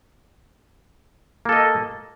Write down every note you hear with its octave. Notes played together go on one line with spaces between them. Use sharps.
A#3 A4 D#5